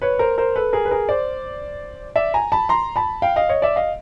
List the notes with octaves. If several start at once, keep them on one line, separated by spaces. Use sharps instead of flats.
B4 C#5
A#4 C5
A#4 C5
A4 B4
G#4 A#4
B4
G#4 A#4
C5 D5
D5 E5
G#5 A#5
A5 B5
A#5 C6
A5 B5
F5 G5
D#5 F5
C#5 D#5
D5 E5
D#5 F5